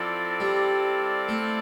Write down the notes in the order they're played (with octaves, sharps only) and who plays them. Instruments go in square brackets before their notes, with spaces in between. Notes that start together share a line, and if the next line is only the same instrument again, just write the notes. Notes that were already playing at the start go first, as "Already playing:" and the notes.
Already playing: [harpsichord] F3 [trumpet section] C4 E4 A4 D5 F5
[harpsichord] G3
A3